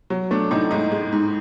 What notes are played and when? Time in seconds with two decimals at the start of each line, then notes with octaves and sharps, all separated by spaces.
0.10 F#3
0.31 A3 D4
0.51 A2 D#4
0.71 G#2 D#4
0.92 G#3
1.12 G#2